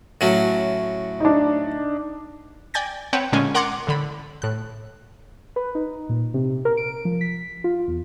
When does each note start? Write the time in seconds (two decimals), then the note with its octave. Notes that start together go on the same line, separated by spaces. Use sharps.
0.21 A2 F#3 C#4
1.20 D4 D#4
2.74 D5 G5 G#5 G6 A6 A#6
3.13 C4 B4 C#5 F#5 G5 A5
3.32 A#2 D3 G#3 C#4 G#5
3.54 A#4 F#5 A#5 C6 D6 G#6
3.87 A2 D3 B5
4.42 A2 F#6
5.56 B4
5.75 D#4
6.09 A#2
6.34 C3
6.65 A#4
6.77 D7
7.05 F3
7.21 B6
7.64 F4
7.88 E2